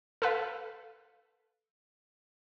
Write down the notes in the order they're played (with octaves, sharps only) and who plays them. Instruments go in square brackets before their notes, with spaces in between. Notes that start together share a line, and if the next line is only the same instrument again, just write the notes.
[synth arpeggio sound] A4 B4 F5